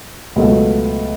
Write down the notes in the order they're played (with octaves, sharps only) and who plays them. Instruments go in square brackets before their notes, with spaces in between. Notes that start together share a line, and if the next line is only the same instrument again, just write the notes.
[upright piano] C#2 B2 F#3 A3